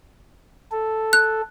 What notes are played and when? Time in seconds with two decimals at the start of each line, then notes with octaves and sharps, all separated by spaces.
0.72 A4
1.13 F#6